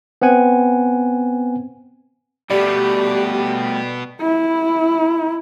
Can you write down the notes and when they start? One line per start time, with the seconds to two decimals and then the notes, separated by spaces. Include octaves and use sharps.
0.22 B3 C4 F#5 G#5
2.50 B2 G3 A3 B3 G4 D5
4.21 E4